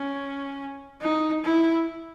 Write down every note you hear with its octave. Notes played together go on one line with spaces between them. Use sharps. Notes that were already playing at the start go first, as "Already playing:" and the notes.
Already playing: C#4
D#4
E4